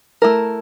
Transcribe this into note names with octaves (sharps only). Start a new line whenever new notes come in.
A3 E4 A#4